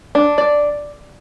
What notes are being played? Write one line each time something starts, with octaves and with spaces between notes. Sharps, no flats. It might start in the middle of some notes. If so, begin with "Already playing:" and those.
D4
D5